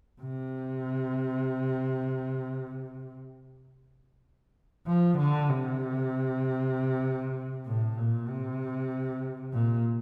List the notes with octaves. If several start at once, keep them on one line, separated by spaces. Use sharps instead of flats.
C3
F3
D3
C3
A2
A#2
C3
A#2